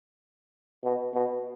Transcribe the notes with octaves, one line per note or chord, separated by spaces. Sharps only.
B2
B2